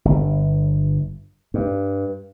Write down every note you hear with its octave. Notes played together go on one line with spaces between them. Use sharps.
G1
G2